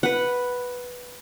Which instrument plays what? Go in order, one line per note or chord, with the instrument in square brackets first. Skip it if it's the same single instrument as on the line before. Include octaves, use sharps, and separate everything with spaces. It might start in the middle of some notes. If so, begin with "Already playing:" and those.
[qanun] B4 F#5